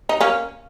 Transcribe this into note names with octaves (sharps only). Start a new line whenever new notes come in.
D#4
A#3 C#4